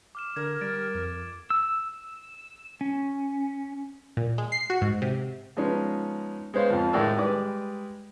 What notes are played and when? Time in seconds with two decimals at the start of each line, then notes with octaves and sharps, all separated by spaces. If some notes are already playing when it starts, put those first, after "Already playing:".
0.15 D6 F6 E7
0.36 D3 A#4 G#6
0.61 G3 A6 D7
0.95 F2
1.50 E6
2.81 C#4
4.17 A#2
4.38 G#3
4.52 C7
4.70 F#4
4.81 G#2
5.02 C3
5.57 F3 G#3 B3 C#4 D#4
6.54 G#3 B3 C5 C#5 F5
6.70 F2 F3
6.93 A2 D#3 G#3 D5 E6
7.17 G3 G#3 B4 D5 D6 D#6